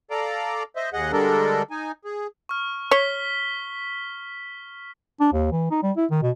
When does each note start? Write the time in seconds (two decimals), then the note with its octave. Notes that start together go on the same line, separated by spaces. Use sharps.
0.11 A4 D5 F5 A#5 D6
0.76 C5 D#5 E5
0.93 D#2 G#4 D#5 F#5
1.12 D3 G3 G#3 D4 A4 A#4
1.71 D#4 G#5
2.05 G#4
2.49 C#6 F6
2.91 C#5 B6 G7
5.20 D4
5.33 D#2
5.52 E3
5.71 D#4
5.83 G3
5.97 E4
6.11 D#3
6.23 B2